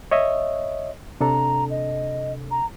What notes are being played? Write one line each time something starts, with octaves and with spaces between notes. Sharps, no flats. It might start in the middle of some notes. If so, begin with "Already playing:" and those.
C#5 D#5 E5
C3 D4 A4 A#5
D#5
A#5